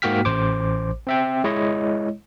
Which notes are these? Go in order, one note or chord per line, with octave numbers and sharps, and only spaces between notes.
G#2 A#3 F#4 G5 F6 B6
A1 C5 D6
C4 E5 G5
G#3 E4 C#5 D#5